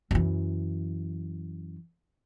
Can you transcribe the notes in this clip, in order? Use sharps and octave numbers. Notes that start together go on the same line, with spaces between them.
F#2 E3